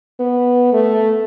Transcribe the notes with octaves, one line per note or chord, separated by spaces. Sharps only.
B3
A3